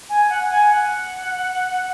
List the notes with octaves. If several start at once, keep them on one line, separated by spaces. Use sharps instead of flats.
G#5
F#5
G#5
F#5